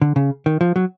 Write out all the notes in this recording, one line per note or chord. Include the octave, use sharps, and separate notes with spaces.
D3
C#3
D#3
F3
F#3